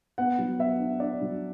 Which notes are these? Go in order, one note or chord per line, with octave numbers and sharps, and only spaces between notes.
B3 F#5
F#3
B3 E5
D4
D4 D5
F#3